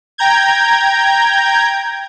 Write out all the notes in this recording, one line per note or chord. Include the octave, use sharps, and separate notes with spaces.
G5 A#5 G6 G#6